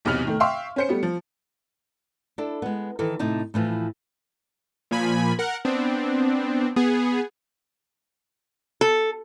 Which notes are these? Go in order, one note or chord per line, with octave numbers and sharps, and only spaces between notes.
B1 E2 C3 B3 F6 F#7
A2 D#3 A3
E5 F5 G5 C6 C#6
C#4 C5 C#7
G3 A3 B3
F3
D4 E4 A4
G#3 B3
D#3 E3 A4
A2 C3 D#4 A5
A2 E3 F3
A#2 F3 G#5 B5
A#4 F#5
B3 C4 D4
B3 G#4
A4